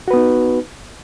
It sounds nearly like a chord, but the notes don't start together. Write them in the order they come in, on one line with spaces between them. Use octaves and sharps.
F#4 B4 B3 D#4